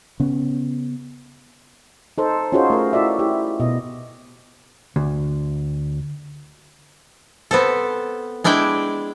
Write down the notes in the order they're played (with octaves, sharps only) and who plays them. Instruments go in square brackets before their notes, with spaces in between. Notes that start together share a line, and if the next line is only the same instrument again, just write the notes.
[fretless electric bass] C#3 B3 C#4
[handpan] D#4 A4 C5
C#4 D#4 F4 F#4 G#4 C5
A3 A#4
E4 F#4 D5 E5
E4 G4
B2 D#5
[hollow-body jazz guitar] D2
[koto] B3 C4 A4
G#3 D4 E4 D5 G5